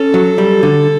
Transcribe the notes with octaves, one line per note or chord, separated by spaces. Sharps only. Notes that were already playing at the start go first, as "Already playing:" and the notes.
Already playing: C#4 A4
F#3
G3
D3